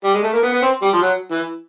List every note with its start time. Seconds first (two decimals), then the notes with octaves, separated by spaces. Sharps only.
0.04 G3
0.14 G#3
0.23 A3
0.33 A#3
0.42 B3
0.53 B3
0.62 C4
0.82 G3
0.93 F3
1.02 F#3
1.31 E3